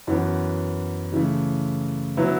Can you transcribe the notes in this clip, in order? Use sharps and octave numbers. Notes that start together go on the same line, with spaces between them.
F#2 E3 B3
C#3 E3 A3
D3 F#3 B3 E4